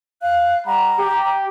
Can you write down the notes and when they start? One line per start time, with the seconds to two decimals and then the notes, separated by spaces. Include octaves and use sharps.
0.22 F5 F#6
0.67 G3 F#5 A#5 B5
0.99 G4